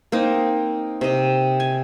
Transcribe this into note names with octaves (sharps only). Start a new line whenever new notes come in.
A#3 C4 D#4
C3 D#5
G#5